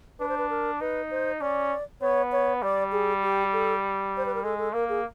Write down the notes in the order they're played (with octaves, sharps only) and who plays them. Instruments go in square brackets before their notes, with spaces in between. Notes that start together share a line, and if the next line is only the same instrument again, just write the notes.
[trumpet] D4 [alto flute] B4
[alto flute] C5
B4
A#4
[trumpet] D#4 [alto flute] B4
[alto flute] C5
[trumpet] C#4 [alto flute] D5
[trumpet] B3 [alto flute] C#5
[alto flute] C#5
[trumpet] G3 [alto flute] D5
[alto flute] G#4
G4
A4
C5
B4
A#4
[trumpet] G#3 [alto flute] A4
[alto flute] A4
[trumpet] A#3 [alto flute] A#4
[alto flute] G#4